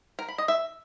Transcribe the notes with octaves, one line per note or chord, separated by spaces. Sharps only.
A#4
B5
D#5
E5